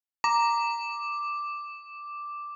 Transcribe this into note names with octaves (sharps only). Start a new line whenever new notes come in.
A#5 D6